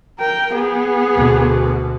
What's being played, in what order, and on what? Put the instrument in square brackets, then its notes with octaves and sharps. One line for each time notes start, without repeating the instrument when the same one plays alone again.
[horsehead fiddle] A#4 G5
B3 G#4
[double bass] D2 B2